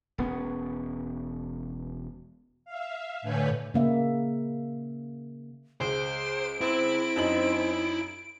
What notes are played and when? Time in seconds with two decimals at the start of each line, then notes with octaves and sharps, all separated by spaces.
0.18 E1 B3 C#4
2.65 E5 F5
3.22 A2 D3 B4 C#5 G#5 G6
3.74 C#3 A#3 E5
5.81 C#2 C5 D7
6.61 C4 E4
7.16 F#2 D#4 F#7